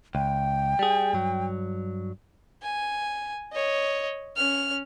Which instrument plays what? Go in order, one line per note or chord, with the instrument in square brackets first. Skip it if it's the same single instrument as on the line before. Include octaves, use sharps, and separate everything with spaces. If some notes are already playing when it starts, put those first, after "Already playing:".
[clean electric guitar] C#2 [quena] G5
[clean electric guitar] G3 G#4
G2 F#3
[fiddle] G#5
C#5 D#5
C#4 F6